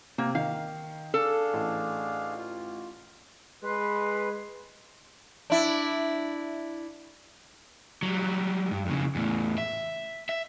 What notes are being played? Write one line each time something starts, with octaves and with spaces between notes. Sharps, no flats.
C3 A#3
D#3 F5
D4 G#4 A4 F5
A1
F4
G#3 B4 C6
D4 E4
F#3 G3
G2
F2 C#3
E2 A2
E5
E5